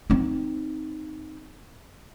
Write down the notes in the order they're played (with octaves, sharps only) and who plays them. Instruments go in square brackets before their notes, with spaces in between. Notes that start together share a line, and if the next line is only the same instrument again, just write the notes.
[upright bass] C4 D#4